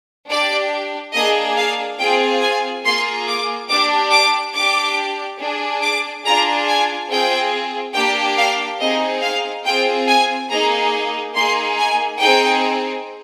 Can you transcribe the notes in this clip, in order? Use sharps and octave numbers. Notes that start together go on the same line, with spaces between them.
D4 G4 D5
A#3 D4 G#4 D#5
F5
C4 F4 G#4 G5
G#5
A#3 F4 G#4 C6
D6
D4 G4 D6
D6
D4 G4 D6
D4 G#4
D6
D4 F4 G#4 A#5
G#5
C4 F4 G#4 G5
A#3 D4 G4 G5
F5
C4 D#4 G#4 D#5
F5
C4 F4 G#4 G5
G#5
A#3 D#4 G#4 A#5
A#3 D#4 G#4 C6
G#5
C4 D#4 G#4 G5